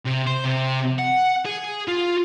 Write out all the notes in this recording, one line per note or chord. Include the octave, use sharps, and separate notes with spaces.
C3
C5
C3
F#5
G#4
F4